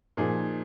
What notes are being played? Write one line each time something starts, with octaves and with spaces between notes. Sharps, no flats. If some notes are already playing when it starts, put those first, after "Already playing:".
A#2 F3 A#3 D#4 G#4